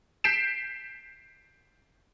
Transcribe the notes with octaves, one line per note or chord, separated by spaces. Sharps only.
G6 B6 C7 D7 E7